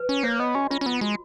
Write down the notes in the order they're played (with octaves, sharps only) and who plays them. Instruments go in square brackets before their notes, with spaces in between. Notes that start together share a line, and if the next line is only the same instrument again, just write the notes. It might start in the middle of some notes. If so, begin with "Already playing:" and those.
Already playing: [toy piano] B4
[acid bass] C#4
[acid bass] A#3 [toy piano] C#5
[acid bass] B3 [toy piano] D#5
[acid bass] C#4 [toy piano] F#4
[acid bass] C#4 [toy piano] F4
[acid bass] C#4
[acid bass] B3 [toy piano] F4
[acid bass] G#3 [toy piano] F#4